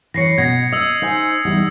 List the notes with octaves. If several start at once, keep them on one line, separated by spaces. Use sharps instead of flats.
E3 C#5 A#6 C7 C#7
B2 G#6 A#6
D#5 D#6 E6
D#4 C5 G#5
E2 G3 D#4